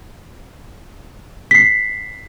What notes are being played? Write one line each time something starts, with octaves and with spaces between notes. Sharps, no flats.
B6 C7